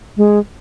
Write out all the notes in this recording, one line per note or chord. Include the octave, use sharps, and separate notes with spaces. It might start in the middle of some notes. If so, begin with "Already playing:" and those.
G#3